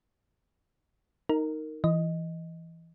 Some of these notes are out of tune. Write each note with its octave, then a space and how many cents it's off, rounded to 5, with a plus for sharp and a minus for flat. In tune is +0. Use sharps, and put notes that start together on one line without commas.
D#4 +0 A#4 -15
E3 +10 D#5 +0